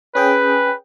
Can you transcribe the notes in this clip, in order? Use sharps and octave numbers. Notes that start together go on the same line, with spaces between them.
C#4 G#4 B4 G5